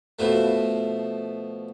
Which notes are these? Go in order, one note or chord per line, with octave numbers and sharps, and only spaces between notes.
B2 F3 A3